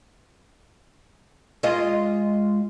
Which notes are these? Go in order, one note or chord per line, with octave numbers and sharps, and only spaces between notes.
G#3 F4 D#5